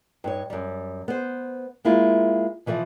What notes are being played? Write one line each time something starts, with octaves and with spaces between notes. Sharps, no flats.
G2 D#4 C#5
F#2 G3
B3 C5
G#3 A#3 E4 F4
B2 E3 F3 C#5 D5